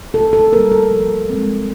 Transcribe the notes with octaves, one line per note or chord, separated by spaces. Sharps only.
B2 A4
A4
G3 A#3 A#4
A4
F3
G#3 C4